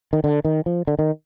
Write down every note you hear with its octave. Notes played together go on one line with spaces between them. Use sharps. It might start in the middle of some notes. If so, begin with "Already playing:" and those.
D#3
D3
D#3
F3
D3
D#3